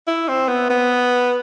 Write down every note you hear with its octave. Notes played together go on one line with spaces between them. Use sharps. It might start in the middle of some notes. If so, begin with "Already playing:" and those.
E4
C4
B3
B3